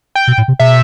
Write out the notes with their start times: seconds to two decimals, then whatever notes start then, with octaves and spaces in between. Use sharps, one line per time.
0.15 G5
0.27 B2
0.38 A2
0.48 C3
0.60 B2 E5